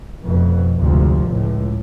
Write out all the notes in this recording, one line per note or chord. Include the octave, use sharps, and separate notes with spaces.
F1 F2 B2
G#1 D2 C3 F3
C#2 A2